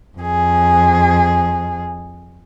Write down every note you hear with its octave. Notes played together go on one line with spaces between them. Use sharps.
F2 G#4